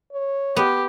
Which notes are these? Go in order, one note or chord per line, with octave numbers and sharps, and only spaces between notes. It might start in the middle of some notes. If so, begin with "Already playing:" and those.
C#5
B3 G4